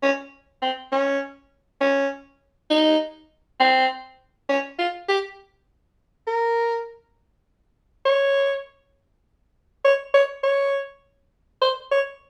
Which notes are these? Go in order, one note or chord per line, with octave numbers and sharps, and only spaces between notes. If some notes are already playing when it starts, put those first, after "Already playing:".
C#4
C4
C#4
C#4
D#4
C4
C#4
F4
G4
A#4
C#5
C#5
C#5
C#5
C5
C#5